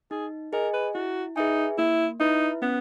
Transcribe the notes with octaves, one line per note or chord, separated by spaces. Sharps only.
D#4 G#4
G#4 A#4 D#5 G#5
B4
E4 F#4
D#4 G#4 B4 E5 G#5
A#3 E4
D#4 E4 B4 E5
B3 C#4